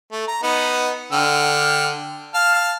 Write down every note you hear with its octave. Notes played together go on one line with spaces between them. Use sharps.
A3
A#5
B3 D#4 F#5
D3 G5 F6
F5 A5 F6